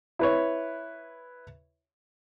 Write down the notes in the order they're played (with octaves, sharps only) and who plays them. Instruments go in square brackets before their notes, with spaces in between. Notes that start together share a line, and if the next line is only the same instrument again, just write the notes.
[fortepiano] E4 B4 C#5